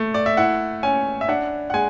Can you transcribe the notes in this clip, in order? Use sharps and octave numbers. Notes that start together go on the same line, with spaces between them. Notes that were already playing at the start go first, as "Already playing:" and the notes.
Already playing: A3
D5
E5
E4 F#5
C#4 G#5
E5
D4 F#5
F#5
G#3 G#5